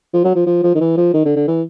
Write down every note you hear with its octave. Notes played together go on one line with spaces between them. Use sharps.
F3
F#3
F3
F3
F3
D#3
E3
F3
D#3
D3
D3
E3